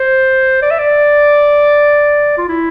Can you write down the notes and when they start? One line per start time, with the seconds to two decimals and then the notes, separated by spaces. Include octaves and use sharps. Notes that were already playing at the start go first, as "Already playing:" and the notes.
Already playing: C5
0.62 D5
0.71 E5
0.79 D5
2.38 F4
2.49 E4